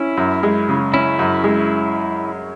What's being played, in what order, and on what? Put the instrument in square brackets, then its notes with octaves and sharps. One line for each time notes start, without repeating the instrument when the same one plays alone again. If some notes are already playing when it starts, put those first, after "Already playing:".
Already playing: [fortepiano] C#4 [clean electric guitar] E4
[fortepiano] F#2
G#3
C#3
[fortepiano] C#4 [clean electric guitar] E4
[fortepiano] F#2
G#3